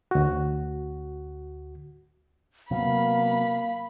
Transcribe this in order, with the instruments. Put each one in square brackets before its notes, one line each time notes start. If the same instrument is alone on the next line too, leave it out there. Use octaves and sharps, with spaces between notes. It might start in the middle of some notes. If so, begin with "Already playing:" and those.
[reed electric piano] D2 F#4
[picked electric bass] C3 F#3 B3 [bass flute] A#3 [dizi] F5 [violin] B5